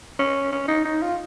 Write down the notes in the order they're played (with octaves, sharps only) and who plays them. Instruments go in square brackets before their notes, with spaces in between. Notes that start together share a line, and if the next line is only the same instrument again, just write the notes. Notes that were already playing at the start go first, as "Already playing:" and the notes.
[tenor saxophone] C#4
C#4
D#4
D#4
F4